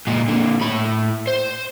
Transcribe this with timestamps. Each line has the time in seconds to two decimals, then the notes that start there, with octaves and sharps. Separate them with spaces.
0.07 A#2 G#3
0.28 A#2 D3
0.62 A2 B5
1.28 C5